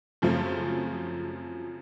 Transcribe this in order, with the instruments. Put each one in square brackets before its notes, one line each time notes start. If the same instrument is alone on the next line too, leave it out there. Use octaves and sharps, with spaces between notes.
[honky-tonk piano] F#2 C#3 F3 A3 C4